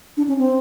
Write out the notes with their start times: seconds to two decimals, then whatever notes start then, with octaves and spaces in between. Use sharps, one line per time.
0.17 D4
0.28 C#4
0.39 C4